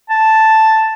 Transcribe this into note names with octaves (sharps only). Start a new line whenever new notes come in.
A5